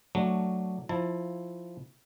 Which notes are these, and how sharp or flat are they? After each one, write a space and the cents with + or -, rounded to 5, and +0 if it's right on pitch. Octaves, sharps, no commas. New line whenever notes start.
F#3 +0 A3 +10 D4 +0
F3 +0 E4 +0 A5 +25